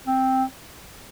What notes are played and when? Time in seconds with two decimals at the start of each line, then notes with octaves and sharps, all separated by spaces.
0.07 C4